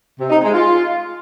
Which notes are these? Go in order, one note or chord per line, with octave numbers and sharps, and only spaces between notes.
C3
D#4
G#3
F4